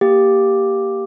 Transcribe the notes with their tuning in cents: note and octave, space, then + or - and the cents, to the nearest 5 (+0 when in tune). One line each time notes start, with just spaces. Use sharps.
A#3 +0 G4 +0